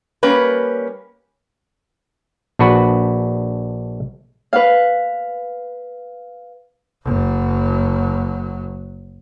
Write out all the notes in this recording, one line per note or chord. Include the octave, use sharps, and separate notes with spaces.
G3 A#3 C#4 B4
A#1 D4 F#4 B4
B4 F5
F#1 F#3